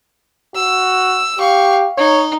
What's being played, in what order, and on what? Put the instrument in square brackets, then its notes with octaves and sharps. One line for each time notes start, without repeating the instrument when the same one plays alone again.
[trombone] F#4 [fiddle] E6
[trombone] G4 [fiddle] F5 C#6
[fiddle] D#4 [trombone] C#5